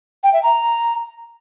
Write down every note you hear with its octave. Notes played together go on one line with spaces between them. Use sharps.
G5
E5
A#5